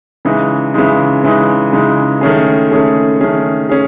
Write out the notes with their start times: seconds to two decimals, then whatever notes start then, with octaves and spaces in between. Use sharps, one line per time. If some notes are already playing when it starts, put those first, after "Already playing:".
0.25 C#3 E3 G#3 D#4
0.74 C#3 E3 G#3 D#4
1.24 C#3 E3 G#3 D#4
1.73 C#3 E3 G#3 D#4
2.21 D#3 A3 C#4 G#4
2.71 D#3 A3 C#4 G#4
3.21 D#3 A3 C#4 G#4
3.69 C#4 G#4